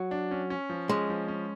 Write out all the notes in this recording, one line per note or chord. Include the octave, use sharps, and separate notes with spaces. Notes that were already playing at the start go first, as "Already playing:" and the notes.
Already playing: F#3
D4
C#4
C#4
F3
G#3 C#4
F3
C#4